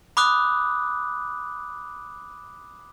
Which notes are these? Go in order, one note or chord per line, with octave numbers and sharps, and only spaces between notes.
B5 D6 D#6 F#6